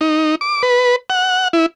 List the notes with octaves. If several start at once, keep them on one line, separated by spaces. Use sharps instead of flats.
D#4
D6
B4
F#5
E4